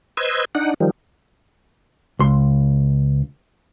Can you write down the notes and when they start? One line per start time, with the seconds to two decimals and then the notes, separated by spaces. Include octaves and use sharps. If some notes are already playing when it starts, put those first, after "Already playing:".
0.17 B4 C5 D#5 E6 G#6
0.55 D4 D#4 F#5
0.80 D#3 F3 G3
2.19 C#2 C6